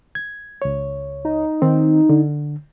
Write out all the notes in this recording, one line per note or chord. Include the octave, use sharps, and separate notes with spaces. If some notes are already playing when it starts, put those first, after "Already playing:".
G#6
C#2 C#5
D#4
D#3 C4
D3